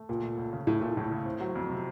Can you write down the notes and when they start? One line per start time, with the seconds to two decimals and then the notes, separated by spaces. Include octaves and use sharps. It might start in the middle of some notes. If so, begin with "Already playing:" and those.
Already playing: A3
0.09 C#2 A#2
0.23 A3
0.38 C#2
0.53 C#3
0.67 C#2 A2
0.81 A#2 A3
0.97 C#2 A2
1.11 C#3
1.25 C4
1.40 F#3
1.55 F2
1.70 C3